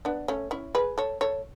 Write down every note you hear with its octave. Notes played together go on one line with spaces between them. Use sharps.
B3 D4
A3 C#4
C#4 E4
G#4 B4
A4 C#5
A4 C#5